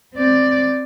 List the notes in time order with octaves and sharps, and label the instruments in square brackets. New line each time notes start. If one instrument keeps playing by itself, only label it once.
[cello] C4 D5